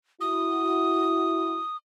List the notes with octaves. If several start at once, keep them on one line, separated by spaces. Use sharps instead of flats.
E4 F#4 D#6